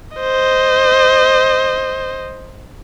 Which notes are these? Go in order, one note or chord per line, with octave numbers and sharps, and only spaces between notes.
C5 D#5